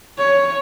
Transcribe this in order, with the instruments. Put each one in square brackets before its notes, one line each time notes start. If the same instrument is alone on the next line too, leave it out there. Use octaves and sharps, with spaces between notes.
[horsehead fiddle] C#5